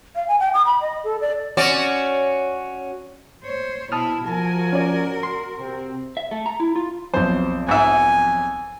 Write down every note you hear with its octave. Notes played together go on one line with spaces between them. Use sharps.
F5
G#5
G5
D#6
B5
D#5
A4
D5
C#4 F#4 D5
C5 C#5
B2 E4 A5 D#6 F6
F3 F#4 A#4 G#5
C#4 D5
C6
C3 C4
E5
A3
A#5
E4
F4
B1 F2 C5
G#2 E5 G#5